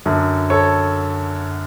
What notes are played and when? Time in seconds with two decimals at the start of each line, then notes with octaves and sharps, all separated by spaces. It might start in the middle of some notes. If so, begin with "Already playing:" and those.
0.06 F#2 D3
0.50 A4 C#5